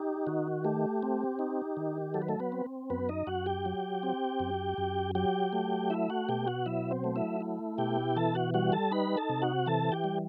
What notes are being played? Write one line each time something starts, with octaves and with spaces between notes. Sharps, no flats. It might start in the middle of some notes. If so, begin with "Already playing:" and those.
Already playing: D#4 G4
D#3 F#4
A3 G4
C4
D#4
D#3
F#3 A4
B4
A3 A4
B3 B4
C4
F#2 B3 B4
D#4 D#5
F#2 F#4 F#5
G4 G5
F#3
C4
F#2
F#2
F#3 G4 G5
A3
E4 E5
F#4 F#5
B2 G4 G5
F#4 F#5
F#3 E4 E5
C4 C5
A3
E4 E5
E4
B2 G4 G5
E3 A4 A5
F#4 F#5
G3 F#4 F#5
A4 A5
D#4 B4 B5
A4 A5
C3
F#4 F#5
E3 A4 A5
G4 G5
G3